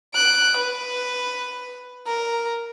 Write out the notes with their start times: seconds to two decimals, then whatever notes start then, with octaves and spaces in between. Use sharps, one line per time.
0.15 F#6 D7
0.57 B4
2.07 A#4